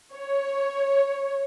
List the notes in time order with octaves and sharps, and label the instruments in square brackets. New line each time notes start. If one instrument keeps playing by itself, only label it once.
[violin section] C#5